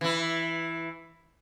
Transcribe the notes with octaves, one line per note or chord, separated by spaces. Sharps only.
E3 E4